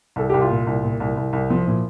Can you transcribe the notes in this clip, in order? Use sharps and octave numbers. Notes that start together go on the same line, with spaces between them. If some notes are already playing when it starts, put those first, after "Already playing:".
C2 A4
C2 G4
F4
A#2
C2
A#2
C2
C2
C2
F3
A#2 E4